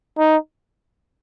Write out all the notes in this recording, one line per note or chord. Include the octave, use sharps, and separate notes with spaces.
D#4